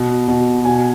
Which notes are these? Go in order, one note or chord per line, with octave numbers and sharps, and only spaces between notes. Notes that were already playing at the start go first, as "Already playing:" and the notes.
Already playing: B2
B2
B2 G#5